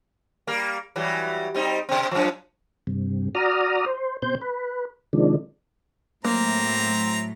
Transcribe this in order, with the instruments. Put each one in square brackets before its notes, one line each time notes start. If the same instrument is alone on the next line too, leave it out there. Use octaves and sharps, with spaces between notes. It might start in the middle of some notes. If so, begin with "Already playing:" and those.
[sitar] G3 A#3
E3 F#3 G3
G3 C4 D#4
B2 C4
F#2 F3
[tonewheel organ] G2 C3
F#4 D5 A#5 D#6 F6
C5
B2 C4 C5 G6
B4
C3 D#3 F3 G#3 D4
[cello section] A2 F#3 A3 [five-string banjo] A#3 [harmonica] C4 A#5